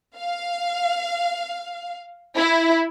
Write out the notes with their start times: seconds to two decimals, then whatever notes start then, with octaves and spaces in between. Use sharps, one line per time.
0.16 F5
2.35 E4